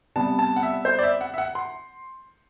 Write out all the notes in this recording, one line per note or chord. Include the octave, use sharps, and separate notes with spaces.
C3 G3 B3 A5
A5
F#5
E5
C5
D5
E5
F#5
E5
F#5
C6